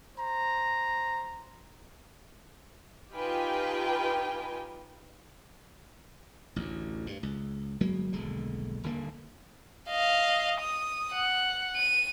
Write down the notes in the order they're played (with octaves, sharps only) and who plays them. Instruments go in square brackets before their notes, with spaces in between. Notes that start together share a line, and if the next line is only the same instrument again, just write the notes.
[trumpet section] C5 A#5
[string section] D#4 F4 G4 B4 G5 G#5
[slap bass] A1 D2
G2
C#2
G1 F#3 G#3 A#3
D#1 B1 D3 G#3
D#1 D3 A#3
[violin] D#5 F5
D#6
F#5
D#7